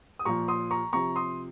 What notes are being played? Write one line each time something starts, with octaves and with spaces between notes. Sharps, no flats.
D#6
A#2 F3 A#5 C#6
C6 D#6
A#5 C#6
C3 F3 A#5 C#6
C6 D#6